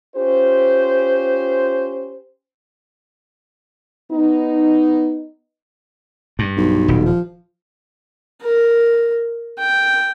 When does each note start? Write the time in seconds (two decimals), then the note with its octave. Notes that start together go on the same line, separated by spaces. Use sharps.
0.16 C#4 F4 G4 C5
4.12 B3 D#4
6.39 G2
6.57 B1
6.88 D#1
7.05 F3
8.42 A#4
9.59 G5